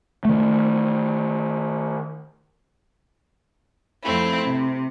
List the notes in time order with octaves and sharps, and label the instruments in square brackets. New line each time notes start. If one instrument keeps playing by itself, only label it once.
[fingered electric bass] D#3 A3
[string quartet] F2 A3 C4 E4
C3